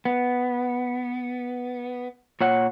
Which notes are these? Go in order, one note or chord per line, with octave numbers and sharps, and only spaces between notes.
B3
A#2 C#5 F#5